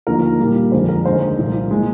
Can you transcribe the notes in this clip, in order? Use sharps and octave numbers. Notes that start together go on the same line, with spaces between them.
D#2 D3 F3 A#3 A#4
A#2 G3 A#3
F2 D3 G#3 C5
A#4
D#2 D3 G#3 C5
C2 A#2 F3 A#3
A#2 G#3